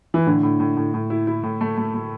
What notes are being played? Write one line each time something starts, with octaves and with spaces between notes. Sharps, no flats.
E3
A2 D3
A2
A2
A2
A2
E4
E4
A2
A3
A3
A3